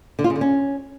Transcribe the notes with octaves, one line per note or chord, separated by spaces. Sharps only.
D3
F4
C#3
D3
C#4